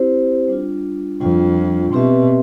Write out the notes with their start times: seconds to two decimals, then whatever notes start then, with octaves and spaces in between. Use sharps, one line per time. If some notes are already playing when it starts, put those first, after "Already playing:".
Already playing: C4 E4 G4 C5
0.48 G3 D4 F4
1.20 F2 G3 D4 F4
1.93 B2 C4 G4 B4 E5